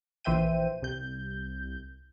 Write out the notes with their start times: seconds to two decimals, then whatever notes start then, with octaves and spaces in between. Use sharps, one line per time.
0.24 A#1 E3 C5 E5 G5 D#7
0.82 C2 G6